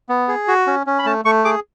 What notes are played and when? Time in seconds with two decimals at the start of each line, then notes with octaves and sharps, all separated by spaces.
0.09 B3
0.28 G#4
0.48 F#4
0.67 C#4
0.87 C#4
0.99 B5
1.06 A3 A5
1.25 A3 C#6
1.45 G#4 D6